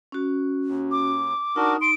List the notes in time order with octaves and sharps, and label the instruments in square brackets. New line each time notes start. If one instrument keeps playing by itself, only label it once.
[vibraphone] C#4 F#4
[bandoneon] D#2
[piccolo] D6
[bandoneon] D4 F#4 A#4 [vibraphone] D#4
[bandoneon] C6 [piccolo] D7